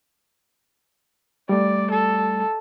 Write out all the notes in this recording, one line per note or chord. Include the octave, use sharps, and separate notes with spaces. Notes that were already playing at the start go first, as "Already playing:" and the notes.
G3 A3 D5
A4